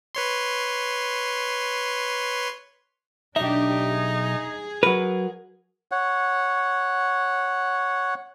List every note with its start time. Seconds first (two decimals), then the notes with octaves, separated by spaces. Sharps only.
0.15 B4 C#5 C6
3.36 B1 D4 D#4 G4 E5
3.89 G#4
4.83 F#3 A#4 B4 F#5
5.92 C#5 F#5